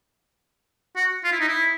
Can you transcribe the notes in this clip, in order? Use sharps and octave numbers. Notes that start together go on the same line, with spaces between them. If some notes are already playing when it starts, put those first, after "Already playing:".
F#4
F4
E4
D#4
E4